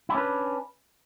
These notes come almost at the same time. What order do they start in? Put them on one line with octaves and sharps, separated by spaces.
E4 D4 C#4 B4